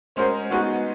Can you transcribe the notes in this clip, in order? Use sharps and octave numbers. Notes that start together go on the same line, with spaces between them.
G#3 C#4 F#4 A#4 C5
G#3 B3 D#4 F#4 G#4